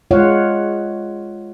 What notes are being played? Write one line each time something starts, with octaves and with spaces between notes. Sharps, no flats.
G#3 F4 C#5 F5 F#5